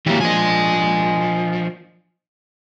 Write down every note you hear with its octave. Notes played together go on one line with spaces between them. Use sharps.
E3 F#3 A#3 G4
F3 D4 D#5 G#5